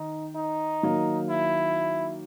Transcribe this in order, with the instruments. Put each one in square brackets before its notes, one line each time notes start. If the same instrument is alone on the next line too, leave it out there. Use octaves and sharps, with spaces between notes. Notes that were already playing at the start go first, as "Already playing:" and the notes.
Already playing: [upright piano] D#3 [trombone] D#4
[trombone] D#4
[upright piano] D#3 F#3 A#3
[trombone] E4